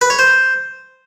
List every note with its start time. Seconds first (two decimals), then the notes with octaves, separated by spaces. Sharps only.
0.01 B4
0.10 C#5
0.19 C5